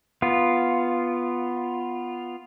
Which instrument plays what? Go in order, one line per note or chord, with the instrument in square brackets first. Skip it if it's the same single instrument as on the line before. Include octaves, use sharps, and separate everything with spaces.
[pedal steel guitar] B3 F4